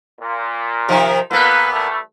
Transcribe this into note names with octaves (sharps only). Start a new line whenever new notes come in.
A#2
C3 D#3 F3
A#2 A#3 B3 A4 B4
E3 G3 A3